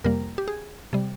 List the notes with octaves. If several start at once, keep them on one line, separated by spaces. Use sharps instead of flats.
F2 C3 G3 A#3 A#4
G4
G#4
C3 G3